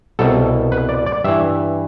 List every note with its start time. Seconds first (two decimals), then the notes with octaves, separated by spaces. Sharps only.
0.19 C2 B2 A4
0.72 B4
0.89 D5
1.06 D5
1.24 G2 E3 E5